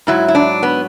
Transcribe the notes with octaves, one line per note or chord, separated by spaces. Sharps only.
G#2 F#3 E4
E4
D4
B3